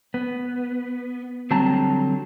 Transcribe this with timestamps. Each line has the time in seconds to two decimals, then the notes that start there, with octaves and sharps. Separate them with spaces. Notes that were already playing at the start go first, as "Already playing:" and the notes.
0.14 B3
1.51 D3 F#3 G3 C4 A5 A#5